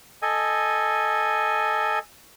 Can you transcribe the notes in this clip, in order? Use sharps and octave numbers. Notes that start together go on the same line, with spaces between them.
A4 D#5 G#5